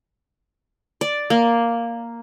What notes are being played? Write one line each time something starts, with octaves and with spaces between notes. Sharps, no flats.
D5
A#3